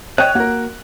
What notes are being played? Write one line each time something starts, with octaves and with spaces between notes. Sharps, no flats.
C#5 D#5 G5 F#6
A#3 F#4 A#4